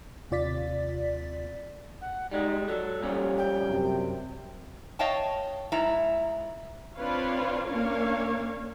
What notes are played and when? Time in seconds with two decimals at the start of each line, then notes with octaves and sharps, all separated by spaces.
0.31 D#2 C3 F4 D5 A6 B6
2.01 F#5
2.31 G3 G#3 D#4
2.68 F#3 A4
3.02 A#2 F3 G3 C#4
3.38 G5
3.68 F#2 C3
4.99 C#5 D#5 F5 G5 A5
5.72 G#2 E4 A#5
6.97 C4 D4 F4 B4 C#5 F5
7.66 A#3 C#4 D4 A#4 C#5 F5